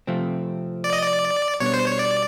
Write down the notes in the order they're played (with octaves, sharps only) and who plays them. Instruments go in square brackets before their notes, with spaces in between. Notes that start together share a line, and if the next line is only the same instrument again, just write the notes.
[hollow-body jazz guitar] C3 F3 A3 C4
[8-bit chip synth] D5
D#5
D5
[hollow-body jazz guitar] B2 G3 B3 D4 [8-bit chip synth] C#5
[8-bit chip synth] C5
C#5
D5